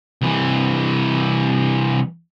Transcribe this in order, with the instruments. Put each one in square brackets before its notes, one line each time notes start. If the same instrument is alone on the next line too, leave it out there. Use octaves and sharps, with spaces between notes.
[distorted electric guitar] C2 E3